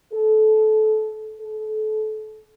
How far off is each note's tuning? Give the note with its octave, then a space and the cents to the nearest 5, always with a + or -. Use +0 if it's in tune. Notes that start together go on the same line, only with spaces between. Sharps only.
A4 -25
A4 -30